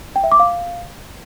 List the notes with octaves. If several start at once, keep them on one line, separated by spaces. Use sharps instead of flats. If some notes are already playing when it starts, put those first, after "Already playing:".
G5
E5
D6
F5